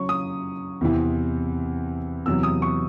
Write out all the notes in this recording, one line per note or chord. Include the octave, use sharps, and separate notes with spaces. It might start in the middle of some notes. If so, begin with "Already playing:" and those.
Already playing: C#3 F#3 C#4 C#6
D#6
E2 C3 E3 C4
E2 C3 F#3 E6
D#6
C#6